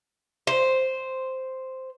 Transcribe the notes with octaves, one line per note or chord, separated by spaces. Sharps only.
C5